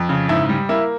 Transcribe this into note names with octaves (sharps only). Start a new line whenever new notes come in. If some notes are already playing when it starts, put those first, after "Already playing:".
Already playing: F2
C#3
G#2 E4
G3
A#3 E4